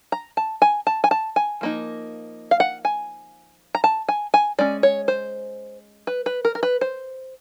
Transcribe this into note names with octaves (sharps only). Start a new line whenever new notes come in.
A#5
A5
G#5
A5
G#5
A5
G#5
F3 A#3 D#4
F5
F#5
G#5
A#5
A5
G#5
G#5
G#3 C#4 D5
C#5
C5
B4
B4
A#4
A#4
B4
C5